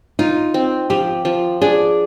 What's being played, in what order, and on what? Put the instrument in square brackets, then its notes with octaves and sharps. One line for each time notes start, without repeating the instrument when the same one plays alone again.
[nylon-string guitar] D#4 [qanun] F4
[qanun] C4
[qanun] F3 [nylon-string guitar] G4
[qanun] F3
[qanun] D4 [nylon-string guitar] G#4